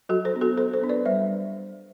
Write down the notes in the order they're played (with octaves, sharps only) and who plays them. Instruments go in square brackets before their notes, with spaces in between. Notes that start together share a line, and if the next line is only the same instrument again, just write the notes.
[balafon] F#3 F#4 A4
A4 C5
B3 D4
F#4 A4
F#3 A4 C5
A4 C5
B3 D4
B4 D5
G3 C5 E5